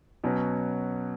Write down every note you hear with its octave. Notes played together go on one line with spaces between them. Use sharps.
B2 F#3 C#4